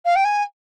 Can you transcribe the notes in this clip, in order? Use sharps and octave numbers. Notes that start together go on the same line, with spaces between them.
F5
G5
G#5